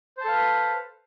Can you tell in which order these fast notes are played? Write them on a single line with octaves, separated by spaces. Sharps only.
C5 A5 A4 F5 B4